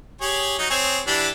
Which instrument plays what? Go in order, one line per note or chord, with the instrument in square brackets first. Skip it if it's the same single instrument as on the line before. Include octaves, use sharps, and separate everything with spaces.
[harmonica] G4 G#4 C#5
F#3 D#4
C4 G#4 C#5
E3 D4 G4